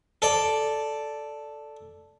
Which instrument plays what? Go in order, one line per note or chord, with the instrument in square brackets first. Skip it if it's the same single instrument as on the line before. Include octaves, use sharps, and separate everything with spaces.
[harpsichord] A4 D5